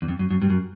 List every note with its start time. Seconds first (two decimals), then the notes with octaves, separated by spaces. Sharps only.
0.02 E2
0.08 F2
0.19 F#2
0.30 F#2
0.42 G2
0.50 F#2